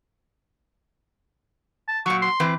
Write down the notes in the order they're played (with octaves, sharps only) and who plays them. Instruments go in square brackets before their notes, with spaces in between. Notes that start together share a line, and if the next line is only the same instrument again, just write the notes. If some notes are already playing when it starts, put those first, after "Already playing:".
[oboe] A5
[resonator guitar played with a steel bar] A#2 F#3 [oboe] C#6
[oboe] C6
[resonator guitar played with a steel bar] E3 C4 B4